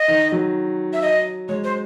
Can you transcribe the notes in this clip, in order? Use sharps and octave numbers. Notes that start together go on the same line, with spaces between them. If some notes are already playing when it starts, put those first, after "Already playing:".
Already playing: D#5
D#3
F#3
E5
D#5
G#3 C#5
C5